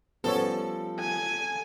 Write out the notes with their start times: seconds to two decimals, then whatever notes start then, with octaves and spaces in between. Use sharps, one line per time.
0.24 F3 G3 B3 C#4 A4 C#5
0.99 G#5